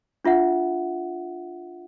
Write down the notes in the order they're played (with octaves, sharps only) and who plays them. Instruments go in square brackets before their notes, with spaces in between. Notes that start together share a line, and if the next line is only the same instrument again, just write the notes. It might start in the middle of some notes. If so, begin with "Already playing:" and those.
[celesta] D4 F4 E5 F#5